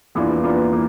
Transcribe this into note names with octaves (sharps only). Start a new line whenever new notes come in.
E2 E3 A#3 D4 F4
E2 E3 A#3 D4 F4
E3 A#3